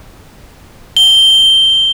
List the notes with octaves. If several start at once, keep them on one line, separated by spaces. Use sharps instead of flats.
G7